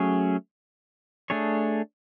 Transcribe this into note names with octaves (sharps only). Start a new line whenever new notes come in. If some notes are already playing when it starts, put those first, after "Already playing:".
Already playing: F#3 A3 C#4 G#4 C#5
A3 D4 G#4 C#5